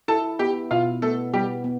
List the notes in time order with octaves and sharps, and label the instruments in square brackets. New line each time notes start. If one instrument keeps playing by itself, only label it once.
[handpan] E4 [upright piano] A4 A5
[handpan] B3 [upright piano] G4 G5
[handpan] B2 [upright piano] F4 F5
[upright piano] A3 A4 [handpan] B3
[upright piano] G3 G4 [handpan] B3
[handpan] B3